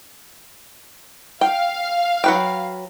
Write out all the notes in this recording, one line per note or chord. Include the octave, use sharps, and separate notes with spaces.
F5 G5
F#3 B4 G5